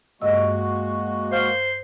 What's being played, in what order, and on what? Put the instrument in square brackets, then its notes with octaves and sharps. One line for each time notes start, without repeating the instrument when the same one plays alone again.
[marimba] G2 D#5 E6 [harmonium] G#3 A#3 F#4
[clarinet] C5 [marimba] F5 F6